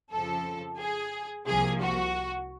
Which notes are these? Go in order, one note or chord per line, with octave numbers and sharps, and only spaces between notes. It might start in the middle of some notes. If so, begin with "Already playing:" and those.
F2 C#3 F3 A4
G#4
C2 C3 F3 A#3 G#4
F#4